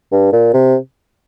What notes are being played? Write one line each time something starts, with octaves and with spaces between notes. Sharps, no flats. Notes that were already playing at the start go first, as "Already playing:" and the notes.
G2
A#2
C3